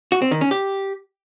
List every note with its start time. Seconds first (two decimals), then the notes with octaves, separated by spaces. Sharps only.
0.12 F#4
0.22 C4
0.31 D#3
0.41 C#4
0.51 G4